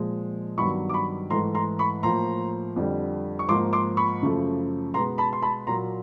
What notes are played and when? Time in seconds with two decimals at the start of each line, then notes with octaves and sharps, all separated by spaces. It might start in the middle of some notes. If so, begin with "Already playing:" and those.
Already playing: A#2 F3 G#3
0.58 G2 D#3 F#3 B3 B5 C#6
0.89 D6
0.94 B5 C#6
1.30 G#2 E3 A3 A#5 C6
1.55 A#5 C6
1.79 B5 C#6
2.03 A2 F3 A#3 A#5 C6
2.76 F2 D3 G3
3.39 C#6
3.49 G#2 F3 A#3 C6 D6
3.73 C6 D6
3.97 B5 C#6
4.22 F#2 C#3 F3 A3
4.94 B2 G#3 B3 A#5 C6
5.18 A5 B5
5.33 C6
5.42 A5 B5
5.67 A#2 F#3 A#3 A#5 C6